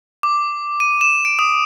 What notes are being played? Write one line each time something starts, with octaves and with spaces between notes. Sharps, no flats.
D6
D#7
E7
D7
D#6